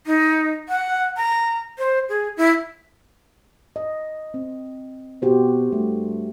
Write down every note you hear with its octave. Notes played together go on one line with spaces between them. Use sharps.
D#4
F#5
A#5
C5
G#4
E4
D#5
C4
B2 F#4 G4 C5
G2 A3